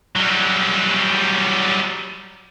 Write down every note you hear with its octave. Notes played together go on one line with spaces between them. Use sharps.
F#3 G3